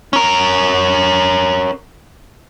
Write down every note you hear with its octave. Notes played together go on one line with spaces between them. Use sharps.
C#4 A#4